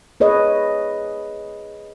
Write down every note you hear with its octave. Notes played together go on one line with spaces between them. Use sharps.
G#4 B4 C#5 D#5